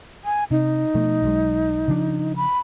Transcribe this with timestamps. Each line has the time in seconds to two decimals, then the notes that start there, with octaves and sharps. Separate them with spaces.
0.25 G#5
0.51 C3 D#4
0.95 B2 F3 A3
1.22 B1 F#3 G#3
1.88 C#3 F3 D4
2.36 B5